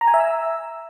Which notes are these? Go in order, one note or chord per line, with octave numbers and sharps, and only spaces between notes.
A#5
G#5
E5
E6